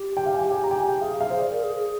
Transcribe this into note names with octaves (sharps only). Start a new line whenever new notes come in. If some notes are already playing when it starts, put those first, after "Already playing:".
Already playing: G4
G5
F5
G#5
G5
G#5
A#5
G5
G#5
G5
G#4 F5
F5
G#4 C5
D5
A#4
G#4
G#4